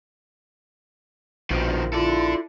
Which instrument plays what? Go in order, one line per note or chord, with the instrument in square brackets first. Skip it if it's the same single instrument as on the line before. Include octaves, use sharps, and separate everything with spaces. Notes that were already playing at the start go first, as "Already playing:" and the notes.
[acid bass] A#1 [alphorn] B2 [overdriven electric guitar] D#3 F3
[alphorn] E4 [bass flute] F4 [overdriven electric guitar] A4 D5